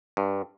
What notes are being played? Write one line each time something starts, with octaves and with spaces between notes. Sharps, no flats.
G2